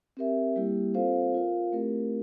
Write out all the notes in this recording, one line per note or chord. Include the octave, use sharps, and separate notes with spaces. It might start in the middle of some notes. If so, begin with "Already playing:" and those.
C4 G4 A#4 E5
G3 A#3 E4 G4
C4 F4 A4 C5 F5
F4 A#4 F5
A3 C4 E4 G4 A#4